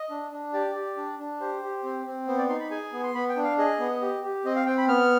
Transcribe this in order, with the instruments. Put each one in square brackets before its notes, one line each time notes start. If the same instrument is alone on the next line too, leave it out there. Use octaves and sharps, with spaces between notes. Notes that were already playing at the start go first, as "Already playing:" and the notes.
Already playing: [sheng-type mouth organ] D#5
D4
D4
G4 D5
G4
D4
D4
G4 C5
G4
C4
C4
B3 C5
D5
D#4 C6
B5
G#4 G#5
B3
C6
B3 B5
G5
D4
F5
G#4 D#5
B3
G4
G4
C4 D#5
F5
C4 G5
B5
B3 F6